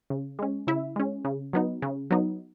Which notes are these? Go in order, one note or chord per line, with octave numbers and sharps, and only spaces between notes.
C#3
G#3 C#4
C#3 E4 E5
G#3 C#4
C#3
F#3 B3 D#4
C#3
F#3 B3 D#4